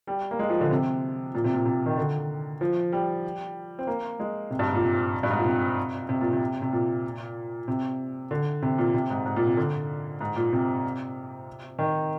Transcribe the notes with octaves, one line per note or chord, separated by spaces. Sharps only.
G3
A#3
G#3
F3
D3
C3
A#2
C3
A#2
C3
D#3
D3
F3
G3
C4
A#3
G#3
C3
G2
G#2
A#2
C3
G2
G#2
A#2
C3
C3
A#2
C3
C3
A#2
C3
D3
C3
A#2
C3
G#2
G#2
A#2
C3
D3
G#2
A#2
C3
D#3